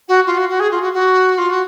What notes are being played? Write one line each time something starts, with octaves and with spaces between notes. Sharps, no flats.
F#4
F4
F#4
F#4
G#4
F4
F#4
F#4
F4
F#4